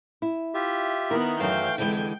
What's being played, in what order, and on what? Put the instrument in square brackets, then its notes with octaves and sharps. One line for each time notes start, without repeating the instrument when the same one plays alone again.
[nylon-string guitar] E4
[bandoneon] F4 G4 E5
[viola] D#3 B3 [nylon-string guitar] E4 [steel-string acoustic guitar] A#4
[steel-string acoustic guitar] F#2 F#3 [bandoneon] E3 A3 F5 [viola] G5
[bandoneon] F2 [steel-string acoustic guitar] D3 E3 G#3